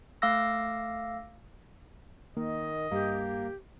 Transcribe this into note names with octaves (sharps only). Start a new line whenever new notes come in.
A3 F5 D6 E6 A#6
D#3 A#3 D#5
G2 A#3 G4